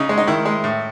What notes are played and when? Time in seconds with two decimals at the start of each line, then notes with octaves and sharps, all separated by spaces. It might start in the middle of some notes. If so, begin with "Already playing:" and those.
Already playing: C#3 D#4
0.09 G#3
0.18 D#4
0.27 D#3 E4
0.45 G#3
0.64 A2